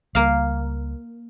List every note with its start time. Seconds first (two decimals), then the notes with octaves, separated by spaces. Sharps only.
0.15 C#2 G3 A#3 F5